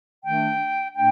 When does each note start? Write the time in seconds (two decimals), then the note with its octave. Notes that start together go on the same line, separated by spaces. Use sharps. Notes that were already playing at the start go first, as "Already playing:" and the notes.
0.24 D#3 A3 D4 G5
0.95 A2 A3 D4 G5